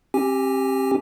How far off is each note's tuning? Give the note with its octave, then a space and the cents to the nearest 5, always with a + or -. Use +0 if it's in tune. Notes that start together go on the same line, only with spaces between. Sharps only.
C4 +35 G4 +0 G#5 -5